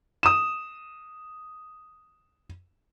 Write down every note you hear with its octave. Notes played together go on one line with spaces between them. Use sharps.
D#6 E7